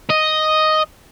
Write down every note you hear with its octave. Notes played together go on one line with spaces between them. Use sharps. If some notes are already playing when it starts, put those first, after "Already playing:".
D#5